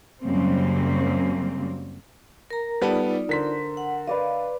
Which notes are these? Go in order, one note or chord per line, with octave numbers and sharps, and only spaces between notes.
F#2 C#3 G3 A#3 C4
A#4 A#5
G3 B3 D#4 F4 A4 D5
D3 A#4 C5 B6
F#5
B4 D5 D#5 F5